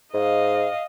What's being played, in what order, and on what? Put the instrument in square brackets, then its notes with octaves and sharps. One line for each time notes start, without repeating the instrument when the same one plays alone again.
[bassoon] G#2 [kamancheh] D#5 F5